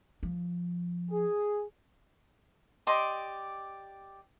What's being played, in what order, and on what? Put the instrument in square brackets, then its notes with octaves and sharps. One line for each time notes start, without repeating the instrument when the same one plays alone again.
[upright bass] F3
[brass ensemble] G#4
[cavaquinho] G4 D5 D#5 C6